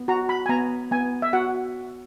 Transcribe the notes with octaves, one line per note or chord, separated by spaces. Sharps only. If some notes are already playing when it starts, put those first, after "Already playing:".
Already playing: B3
F#4 A#5
B5
G#5
B3 A#5
B3 G#5
E5
F#4 F#5